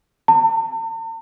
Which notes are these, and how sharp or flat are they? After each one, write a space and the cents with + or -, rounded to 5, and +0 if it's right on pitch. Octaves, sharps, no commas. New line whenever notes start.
A5 +45